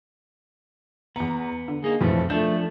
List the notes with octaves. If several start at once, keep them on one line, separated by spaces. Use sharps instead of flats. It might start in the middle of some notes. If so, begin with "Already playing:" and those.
E2 B3 A#5
D3
A#3 D#4 G#4
B1 F2 A2 E3 F3 A3
F3 A3 D4 G6